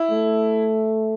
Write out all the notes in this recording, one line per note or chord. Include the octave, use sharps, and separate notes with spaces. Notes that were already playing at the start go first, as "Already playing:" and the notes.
Already playing: E4
A3